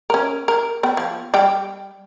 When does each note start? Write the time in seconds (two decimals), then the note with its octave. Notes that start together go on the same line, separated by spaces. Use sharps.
0.10 C#4 A#4
0.48 A#4
0.83 B3 G5
0.97 F3
1.34 G3 G4 G5